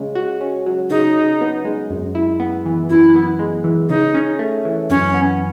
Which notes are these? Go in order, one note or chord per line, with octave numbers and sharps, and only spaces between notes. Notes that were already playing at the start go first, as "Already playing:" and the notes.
Already playing: C#3 G#3
F#4
C#4
F#3
C#3 D#4
C#3
B3
G#3
F#2
E4
B3
E3
F#2 E4
B3
G#3
E3
C#3 D#4
C#4
A3
E3
F#2 C#4
B3